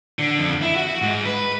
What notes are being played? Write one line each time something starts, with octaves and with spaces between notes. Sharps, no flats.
D3
F2
E4
F#4
G#2
B4